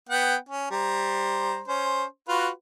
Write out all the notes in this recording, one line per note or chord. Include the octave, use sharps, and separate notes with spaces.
B3 F#5 G5
C#4
G3 C5 A#5
C#4 C5
F4 F#4 B4